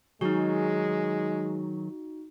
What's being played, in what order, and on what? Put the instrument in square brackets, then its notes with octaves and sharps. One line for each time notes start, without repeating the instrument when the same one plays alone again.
[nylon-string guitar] D#3 F#3 G#4 [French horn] G#3 [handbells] D#4 F#4